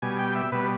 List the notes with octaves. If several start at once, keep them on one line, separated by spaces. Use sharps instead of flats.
B2 G3 G#5
G5
E5
B2 G3 B4